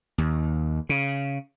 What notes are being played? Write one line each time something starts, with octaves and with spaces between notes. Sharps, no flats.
D#2
C#3